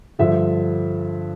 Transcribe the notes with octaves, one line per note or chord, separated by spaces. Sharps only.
G2 D3 F3 E5